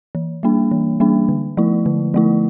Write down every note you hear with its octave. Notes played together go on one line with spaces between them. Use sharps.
E3
G3 A#3 D4
E3
G3 A#3 D4
D3
F3 A3 E4
D3
F3 A3 E4